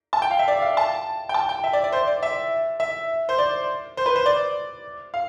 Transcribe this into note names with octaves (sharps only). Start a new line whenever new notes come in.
A5
G5
F5
E5
D5
F5
A5
G5
A5
G5
E5
D5
D5
C5
D5
E5
E5
C5
D5
C5
B4
C5
D5
F5